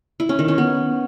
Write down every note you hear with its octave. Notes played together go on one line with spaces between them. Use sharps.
E4
C#4
D#3
C#4
B3